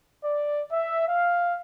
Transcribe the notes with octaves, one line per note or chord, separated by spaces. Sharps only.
D5
E5
F5